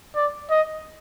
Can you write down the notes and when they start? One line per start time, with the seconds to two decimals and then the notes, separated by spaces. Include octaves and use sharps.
0.16 D5
0.50 D#5